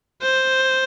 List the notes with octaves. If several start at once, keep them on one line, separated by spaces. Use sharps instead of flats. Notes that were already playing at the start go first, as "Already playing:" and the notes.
C5